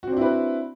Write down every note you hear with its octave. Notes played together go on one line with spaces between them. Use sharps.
C4 D4 E4 F#4 B4